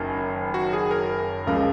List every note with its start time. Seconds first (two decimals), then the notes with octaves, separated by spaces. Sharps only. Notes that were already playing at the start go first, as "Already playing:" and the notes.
Already playing: F#1 F#2 D#3 A#4
0.54 F#4
0.73 G#4
0.91 A#4
1.47 C#2 C#3 F3 G#3 A#4